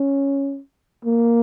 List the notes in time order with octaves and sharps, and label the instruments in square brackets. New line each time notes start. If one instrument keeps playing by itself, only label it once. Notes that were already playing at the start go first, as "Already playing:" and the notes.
Already playing: [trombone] C#4
A#3